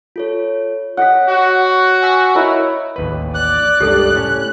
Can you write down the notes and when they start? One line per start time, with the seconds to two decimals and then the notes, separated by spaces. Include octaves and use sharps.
0.16 F4 A4 C#5
0.97 C#5 D#5 F#5 B6
1.29 F#4
2.03 G#5 E6 B6
2.35 E4 A#4 C#5 D#5
2.96 A1 D#2 B4
3.34 D5 F#6
3.80 C#2 G2 G4 A4
4.15 A2 C#4